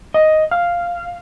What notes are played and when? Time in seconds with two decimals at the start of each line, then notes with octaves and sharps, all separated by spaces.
0.14 D#5
0.51 F5